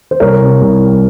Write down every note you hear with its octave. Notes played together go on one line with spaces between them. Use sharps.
C5
C2 A#4 C#5
C3
C2
G3